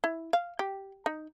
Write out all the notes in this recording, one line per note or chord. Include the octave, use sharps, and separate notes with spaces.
E4
F5
G4
D#4